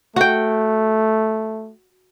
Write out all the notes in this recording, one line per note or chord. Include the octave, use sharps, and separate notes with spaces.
A3 F#4 G5